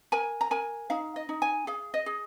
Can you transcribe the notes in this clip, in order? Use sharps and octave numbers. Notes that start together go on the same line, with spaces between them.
A#4 G#5
A#5
A#4 G#5
D#4 F5
D#5
D#4
G#5
G#4 F5
D#5
G#4